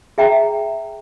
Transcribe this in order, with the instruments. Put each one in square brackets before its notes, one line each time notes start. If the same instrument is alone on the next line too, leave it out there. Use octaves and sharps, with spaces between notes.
[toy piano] G#4 E5 G5 A#5